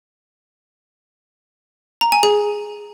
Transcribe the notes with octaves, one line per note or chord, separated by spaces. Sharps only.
A#5
G#5
G#4